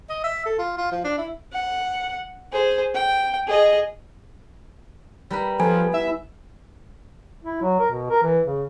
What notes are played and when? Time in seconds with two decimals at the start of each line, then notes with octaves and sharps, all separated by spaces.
0.09 D#5
0.24 E5
0.45 A4
0.59 F4
0.78 F4
0.91 F3
1.04 D4
1.18 E4
1.53 F#5
2.52 G#4 C5
2.94 G5
3.47 G#4 D#5
5.30 G3 A#4 B4
5.60 F3 B3 A4 G#5
5.94 E4 E5
7.44 E4
7.62 F#3
7.79 A#4
7.91 B2
8.10 A#4
8.23 E3
8.45 C#3